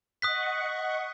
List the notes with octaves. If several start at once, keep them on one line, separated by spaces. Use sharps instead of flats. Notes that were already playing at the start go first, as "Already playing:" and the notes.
D#5 F#5 C#6 D#6 F#6 B6